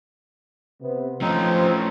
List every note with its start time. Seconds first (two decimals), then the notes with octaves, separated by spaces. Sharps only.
0.81 C3 B3
1.21 F3 A3 C4 C#4 D#4